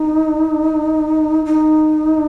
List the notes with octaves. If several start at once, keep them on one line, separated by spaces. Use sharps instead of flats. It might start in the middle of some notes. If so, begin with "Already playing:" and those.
Already playing: D#4
D#4